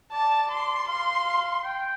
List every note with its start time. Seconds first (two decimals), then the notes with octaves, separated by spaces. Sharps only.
0.12 D5 A5
0.51 C6
0.88 F5 C6
1.64 G5